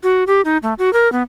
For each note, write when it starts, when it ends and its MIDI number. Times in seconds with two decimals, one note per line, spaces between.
0.03 0.24 66
0.27 0.41 67
0.45 0.57 63
0.63 0.74 57
0.79 0.92 66
0.93 1.10 70
1.12 1.23 59